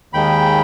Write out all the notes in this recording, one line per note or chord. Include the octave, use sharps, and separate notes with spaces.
D#2 D#3 G#3 G5 B5